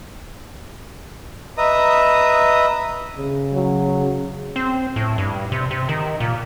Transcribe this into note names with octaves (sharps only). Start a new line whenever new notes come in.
B4 D#5 E5 A#5 D#6
C#3
F#3
C4
A2
G2
C3
C3
D#3
A#2